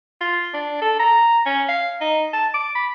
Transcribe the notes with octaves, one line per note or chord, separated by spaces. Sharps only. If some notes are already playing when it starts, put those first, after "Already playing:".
F4
D4
A4
A#5
C#4
F5
D#4
A5
D6
B5